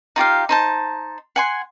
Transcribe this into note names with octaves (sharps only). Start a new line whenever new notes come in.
D#4 F4 G4 F5
D#4 C5 A5
F#5 G#5 C6